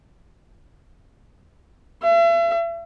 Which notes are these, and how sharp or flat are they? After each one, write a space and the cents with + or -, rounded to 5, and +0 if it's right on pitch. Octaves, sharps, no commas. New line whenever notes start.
E5 +40